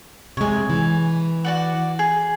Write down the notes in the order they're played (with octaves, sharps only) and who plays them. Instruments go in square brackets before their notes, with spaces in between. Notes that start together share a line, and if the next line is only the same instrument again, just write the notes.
[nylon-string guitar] C3 G#3 [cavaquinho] C#5 G#5
[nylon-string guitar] E3
[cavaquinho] F#4 D5 F#5
G#4